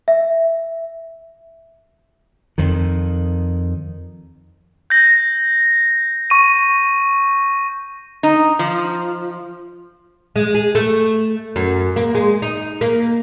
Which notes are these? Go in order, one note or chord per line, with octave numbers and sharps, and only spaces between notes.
E5
F2 D#3
G6 A#6
C#6 D#7
D#4
F3
G#3
G#4
A3
F#2
A#3
G#3
D#4
A#3